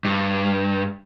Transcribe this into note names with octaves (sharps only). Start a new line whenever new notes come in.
G2